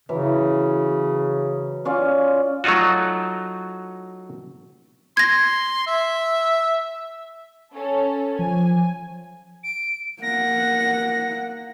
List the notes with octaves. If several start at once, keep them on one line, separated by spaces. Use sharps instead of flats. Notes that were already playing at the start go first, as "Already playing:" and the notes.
C#3 E3 F#3
C#4 F4 D5
F#3 A3 D#4 F4 F#4
C6 G#6 A#6
E5
C#4 A4
F3 G#5
D7
A#3 F#5 A#6